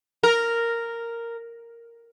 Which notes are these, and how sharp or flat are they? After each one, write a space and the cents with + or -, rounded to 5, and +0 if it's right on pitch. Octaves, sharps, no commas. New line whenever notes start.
A#4 -5